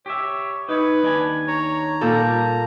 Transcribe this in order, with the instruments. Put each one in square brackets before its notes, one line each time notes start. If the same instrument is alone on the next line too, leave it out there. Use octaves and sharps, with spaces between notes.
[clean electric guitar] G4 E5 [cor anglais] C#5
[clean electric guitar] D#4 C#5 [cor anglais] B4
[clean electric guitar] D#2 D4 G#5
[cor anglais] C#5 [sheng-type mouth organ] A#5
[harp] A#2 A4 [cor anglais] G3